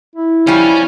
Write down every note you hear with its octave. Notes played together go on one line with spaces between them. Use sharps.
E4
F3 G3 C#4